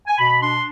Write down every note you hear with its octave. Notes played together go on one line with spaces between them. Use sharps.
G#5
B2 B5
D4 C6